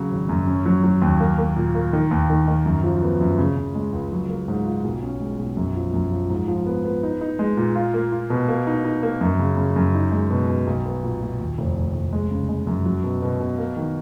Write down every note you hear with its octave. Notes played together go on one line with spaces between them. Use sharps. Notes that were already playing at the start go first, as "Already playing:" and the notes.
Already playing: C#3 F#3
G#1
F#2
C#4
F#3
F#3
D#2
A#3
A#3
A#2
A#3
D#3
D#2
D#3
D#3
F#2
F3
B3
F#2
C#3
C#3
G#3
C#2
F#3
A#3
G#2
F4
B1
C#4
G#3
B1
F#2
F3
F#2
F3
G#2
F3
B3
B3
D#4
D#4
G#3
A#2
F4
A#3
F4
B2
A#3
D#4
D#4
A#3
F#2
C#3
C#3
F#2
D#4
G#3
B2
B2
B1
B3
A#2
A#2
D#2
F1
D#2
F1
G#3
C#3
G#3
F#2
F#3
B2
B2
B2
A#3
D#3